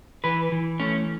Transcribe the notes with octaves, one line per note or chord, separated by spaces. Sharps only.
E3 B4
E3
A3 C#4